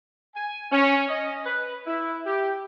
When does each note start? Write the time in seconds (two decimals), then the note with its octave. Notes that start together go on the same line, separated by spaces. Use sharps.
0.35 G#5
0.72 C#4
1.08 D#5
1.45 B4
1.86 E4
2.25 G4